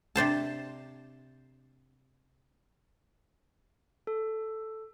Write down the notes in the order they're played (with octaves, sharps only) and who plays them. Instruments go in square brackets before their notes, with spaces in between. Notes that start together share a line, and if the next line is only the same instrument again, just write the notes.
[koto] C3 D4 C5 A5
[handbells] A4